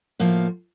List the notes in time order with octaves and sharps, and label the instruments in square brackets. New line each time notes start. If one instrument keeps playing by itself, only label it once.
[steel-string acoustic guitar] A2 F3 A#3